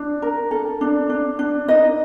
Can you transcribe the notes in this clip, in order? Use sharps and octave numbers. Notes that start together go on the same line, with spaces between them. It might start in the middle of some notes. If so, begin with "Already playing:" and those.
Already playing: D4
A#4
A4
D4
D4
D4
D#4 D#5